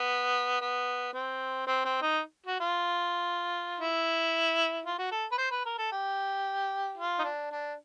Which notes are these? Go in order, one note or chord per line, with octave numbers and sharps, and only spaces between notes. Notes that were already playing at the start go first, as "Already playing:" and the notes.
Already playing: B3
B3
C4
C4
C4
D#4
F#4
F4
E4
F4
F#4
A4
B4
C5
B4
A#4
A4
G4
F4
D#4
D4
D4